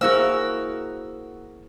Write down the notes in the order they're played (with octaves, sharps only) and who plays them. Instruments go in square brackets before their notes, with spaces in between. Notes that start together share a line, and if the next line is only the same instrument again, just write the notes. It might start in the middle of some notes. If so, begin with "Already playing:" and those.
[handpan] A#3 E4 G#4 [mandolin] F#4 A#4 E6 [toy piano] C5 F5